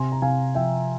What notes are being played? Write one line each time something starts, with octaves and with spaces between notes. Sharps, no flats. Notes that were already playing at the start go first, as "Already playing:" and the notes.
Already playing: C3 G#5 C6
A#5
C3 F5 G#5
F3 E5 G5